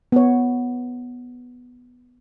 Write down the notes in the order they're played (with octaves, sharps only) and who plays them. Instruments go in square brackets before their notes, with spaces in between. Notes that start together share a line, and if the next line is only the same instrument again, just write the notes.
[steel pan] B3 C#5